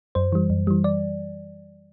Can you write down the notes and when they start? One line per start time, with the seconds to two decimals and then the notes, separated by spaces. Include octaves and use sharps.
0.15 F#2 C5
0.32 E3 G3
0.50 F#2
0.67 E3 G3
0.84 D5